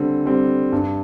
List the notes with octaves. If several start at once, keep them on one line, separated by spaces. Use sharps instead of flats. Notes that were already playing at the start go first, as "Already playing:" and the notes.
Already playing: D3 G3 C4
G3 C4
G2